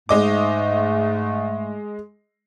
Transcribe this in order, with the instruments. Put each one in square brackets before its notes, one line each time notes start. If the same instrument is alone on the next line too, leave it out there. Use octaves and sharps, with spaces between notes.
[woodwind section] G#2 A3 [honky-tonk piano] G#3 D#5 D6